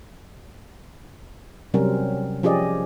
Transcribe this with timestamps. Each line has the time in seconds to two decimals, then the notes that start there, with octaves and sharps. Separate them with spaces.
1.74 C3 F#3 G3 C4 C#4 A#4
2.43 F3 C#4 G4 G#4 D5 D#5